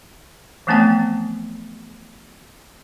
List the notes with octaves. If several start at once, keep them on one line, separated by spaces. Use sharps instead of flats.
E3 F3 A3 B3 C4 G5